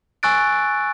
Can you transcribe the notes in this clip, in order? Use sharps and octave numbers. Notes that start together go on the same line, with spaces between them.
G#5 C#6 E6 F#6 A6 D7